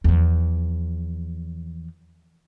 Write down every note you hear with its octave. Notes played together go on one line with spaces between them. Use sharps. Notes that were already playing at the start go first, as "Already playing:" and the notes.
E2 F3